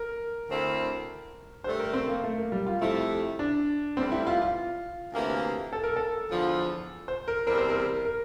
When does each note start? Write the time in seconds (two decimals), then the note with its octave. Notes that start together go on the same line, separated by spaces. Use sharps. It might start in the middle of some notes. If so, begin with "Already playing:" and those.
Already playing: A#4
0.49 D2 D3 A3 C4 E4
1.64 G2 D3 A3 C5
1.79 A#4
1.93 C4
2.08 A#3
2.24 A3
2.38 A#3
2.52 G3
2.66 F4
2.81 F2 C3 F3 A3 E4
3.39 D4
3.97 A2 E3 G3 C4
4.11 E4
4.27 F4
4.42 F4
5.13 D2 C3 E3 A#3
5.73 A4
5.84 A#4
5.96 A4
6.30 E2 D3 F3
7.08 C5
7.28 A#4
7.46 E2 C3 G3 C4 E4 A#4
7.58 C5
7.70 A#4
8.05 A#4